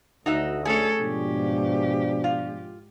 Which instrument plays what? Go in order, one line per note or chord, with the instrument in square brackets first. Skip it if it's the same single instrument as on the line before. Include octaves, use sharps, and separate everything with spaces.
[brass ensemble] D2 [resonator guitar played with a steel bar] D#4 F#4 E5
[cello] A3 A4 [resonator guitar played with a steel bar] C#4 G#4
[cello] G#2 G4 [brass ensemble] B2 F3 D4
[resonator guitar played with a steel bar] F4